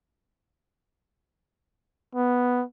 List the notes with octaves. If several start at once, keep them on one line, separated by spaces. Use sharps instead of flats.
B3